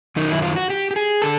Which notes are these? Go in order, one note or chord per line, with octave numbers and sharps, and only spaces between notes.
F#2 D#3 F#3 D#4
E4
F4
F#4
G4
G4
G#4
D3 A4